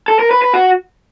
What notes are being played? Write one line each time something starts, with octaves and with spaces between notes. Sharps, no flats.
A4
A#4
B4
B4
F#4